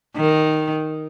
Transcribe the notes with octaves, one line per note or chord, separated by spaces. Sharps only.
D#3